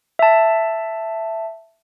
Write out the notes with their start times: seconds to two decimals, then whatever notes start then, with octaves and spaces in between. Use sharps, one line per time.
0.19 E5 A5